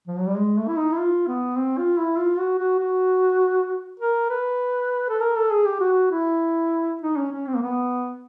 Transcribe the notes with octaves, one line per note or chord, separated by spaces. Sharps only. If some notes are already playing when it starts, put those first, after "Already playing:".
F3
F#3
G3
G#3
A3
E4
D#4
E4
F4
B3
C4
F4
E4
F4
F#4
F#4
F#4
A#4
B4
A4
A#4
A4
G#4
G4
F#4
E4
D#4
C#4
C#4
C4
A#3
B3